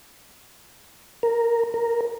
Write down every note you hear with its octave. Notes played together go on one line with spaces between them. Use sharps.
A#4
A#4